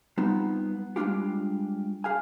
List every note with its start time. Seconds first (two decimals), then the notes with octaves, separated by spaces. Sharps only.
0.18 G3 B3 C4 D#4 F4
0.96 G3 G#3 A#3 D4 F4 G4
2.04 G#4 F5 G#5